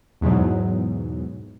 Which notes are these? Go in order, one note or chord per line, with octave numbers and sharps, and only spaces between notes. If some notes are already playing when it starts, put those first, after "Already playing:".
E2 G#2 B2 F#3